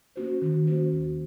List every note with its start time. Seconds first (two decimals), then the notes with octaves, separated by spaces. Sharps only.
0.16 A#3 C#4 F#4 C5
0.42 D#3
0.67 A#3 C#4 F#4 C5
0.93 D#2